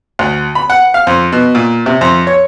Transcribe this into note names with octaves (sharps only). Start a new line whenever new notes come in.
D2
B5
F#5
F5
F2
B2
A#2
C3
F2
C#5